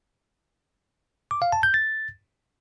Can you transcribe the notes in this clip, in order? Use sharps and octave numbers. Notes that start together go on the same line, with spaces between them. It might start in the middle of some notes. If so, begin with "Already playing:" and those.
D6
F5
A5
G6
A6